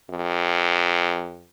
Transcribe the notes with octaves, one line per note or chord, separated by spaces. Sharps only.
F2